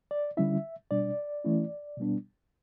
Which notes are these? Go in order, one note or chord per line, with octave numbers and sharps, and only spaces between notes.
D5
D3 G3 C#4 E4 E5
B2 G3 D4 D5
E3 A3 C#4 E4
B2 G3 B3 D4